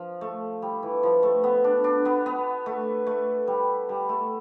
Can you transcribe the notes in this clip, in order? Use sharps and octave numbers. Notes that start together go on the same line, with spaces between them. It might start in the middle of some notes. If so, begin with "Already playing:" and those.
Already playing: F3
A3
G3
E3
F3
A3
B3
D4
D4
B3
B3
A3
A3
G3
G3
A3